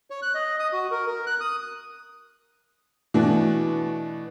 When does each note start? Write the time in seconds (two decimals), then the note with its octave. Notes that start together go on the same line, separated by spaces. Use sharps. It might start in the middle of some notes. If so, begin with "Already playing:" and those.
0.10 C#5
0.22 F#6
0.34 D#5
0.59 D#6
0.73 F#4
0.91 A#4
1.07 A#4
1.27 F#6
1.41 D#6
3.14 B2 E3 A3 D4 F#4